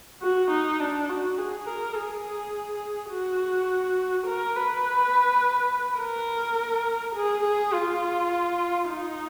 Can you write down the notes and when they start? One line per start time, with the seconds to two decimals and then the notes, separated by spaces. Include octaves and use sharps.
0.22 F#4
0.51 D#4
0.80 D4
1.09 F#4
1.38 G#4
1.67 A#4
1.96 G#4
3.11 F#4
4.27 A#4
4.56 B4
6.00 A#4
7.16 G#4
7.44 G#4
7.73 F4
8.89 D#4